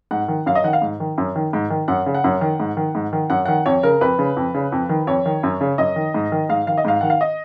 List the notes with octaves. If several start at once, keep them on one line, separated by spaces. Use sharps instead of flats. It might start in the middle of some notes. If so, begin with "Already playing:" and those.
G#2 F#5
D#3
F#2 F5
D#5
D#3 F#5
F5
G#2
D#3
F#2
D#3
G#2
D#3
F#2 F#5
C#3
F#5
F#2
D#3
G#2
D#3
G#2
D#3
F#2 F#5
D#3 F#5
F2 C#5
C#3 A#4
F2 B4
C#3
F2
C#3
F2
D#3
F2 C#5
D#3
F#2
C#3
F#2 D#5
D#3
G#2
D#3
G#2 F5
D#3 F5
D#5
G#2 F5
D#3 F#5
F5
D#5